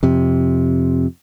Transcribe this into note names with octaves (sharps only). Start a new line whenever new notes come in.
F2 C3